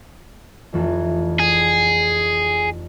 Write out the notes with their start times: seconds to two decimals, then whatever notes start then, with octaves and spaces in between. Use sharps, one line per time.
0.73 F1 F2 E3
1.39 G#4